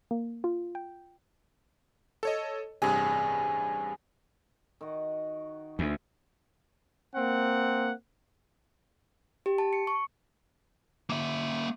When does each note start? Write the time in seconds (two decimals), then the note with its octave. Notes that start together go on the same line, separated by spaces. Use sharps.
0.11 A#3
0.44 F4
0.75 G5
2.23 A4 C#5 D#5
2.82 A1 G2 C3 G#4
4.81 D#3 F#4
5.79 D2 E3
7.15 A#3 C4 F#5
9.46 G4
9.58 A5
9.73 C#7
9.87 C#6
11.10 A#3 E5